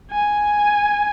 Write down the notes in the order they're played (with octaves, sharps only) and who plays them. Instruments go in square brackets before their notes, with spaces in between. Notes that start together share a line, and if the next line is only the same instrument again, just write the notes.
[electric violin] G#5